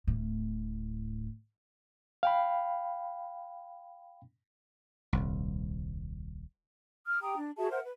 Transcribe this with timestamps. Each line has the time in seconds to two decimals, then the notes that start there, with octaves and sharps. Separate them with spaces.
0.07 D1 A2
2.23 F5 G5 B5
5.13 D#1 C2
7.06 D#6 F6
7.21 G4 G5 A#5 D#6
7.37 D4
7.57 F#4 G#4 E5 A5
7.71 A#4 C5 E5 F#5
7.83 B4